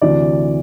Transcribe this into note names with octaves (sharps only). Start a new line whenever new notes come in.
D2 C3 E3 D5